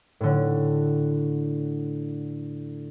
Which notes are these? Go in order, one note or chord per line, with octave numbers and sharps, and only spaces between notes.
A2 D3